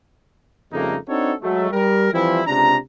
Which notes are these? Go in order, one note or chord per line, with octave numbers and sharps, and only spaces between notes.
F2 C#3 G3 A3 A#3 D#4
C4 D4 D#4 F#4 A4 C#5
F#3 G#3 A3
G3 A#4
E3 F3 G3 C4 E4
C#2 C3 D4 A#5